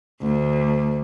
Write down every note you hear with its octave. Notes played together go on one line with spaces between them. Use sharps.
D2